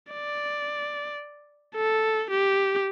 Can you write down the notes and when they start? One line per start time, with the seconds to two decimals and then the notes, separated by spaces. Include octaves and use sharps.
0.13 D5
1.76 A4
2.30 G4